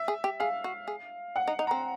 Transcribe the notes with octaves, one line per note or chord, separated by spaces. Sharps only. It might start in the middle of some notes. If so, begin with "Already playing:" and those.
Already playing: E5
G#4
G4
G#4 F5
F#4
G#4
F#5
D#4
D#4
C4 A#5